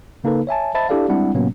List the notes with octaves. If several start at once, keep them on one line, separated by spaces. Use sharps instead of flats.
C#3 A#3 D#4 A4 B4
C#5 E5 G#5 A5
C5 D#5 E5 A5 B5 A6
D4 E4 G4 A4 D5 F5
G3 G#3 C4 D4 E4 F#5
A2 C3 F#3 A#3 B3 C#4